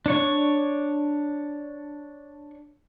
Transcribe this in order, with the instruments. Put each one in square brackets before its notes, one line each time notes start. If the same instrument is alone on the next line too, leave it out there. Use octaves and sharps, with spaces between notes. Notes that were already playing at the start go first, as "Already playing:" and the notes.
[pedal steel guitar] D4 C#5 C#6